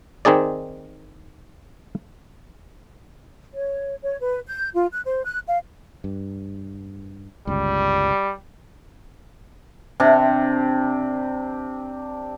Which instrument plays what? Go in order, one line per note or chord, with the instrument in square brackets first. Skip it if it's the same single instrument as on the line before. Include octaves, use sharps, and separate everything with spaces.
[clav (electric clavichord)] D#3 C4 D#4 G#4 D5
[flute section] C#5
C#5
B4
G6
F4
F#6
C5
F#6
F5
[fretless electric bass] G2
[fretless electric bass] G1 C#2 [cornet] G3
[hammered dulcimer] C3 D4